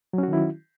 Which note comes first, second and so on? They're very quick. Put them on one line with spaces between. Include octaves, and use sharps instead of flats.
F#3 C#4 F#4 D#3 E4